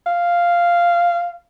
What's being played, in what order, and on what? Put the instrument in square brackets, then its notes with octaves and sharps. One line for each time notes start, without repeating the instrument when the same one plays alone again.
[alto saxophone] F5